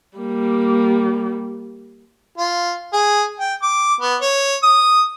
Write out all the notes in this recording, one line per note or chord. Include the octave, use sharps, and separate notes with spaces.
G3 A#3
F4
G#4
G5
D6
B3
C#5
D#6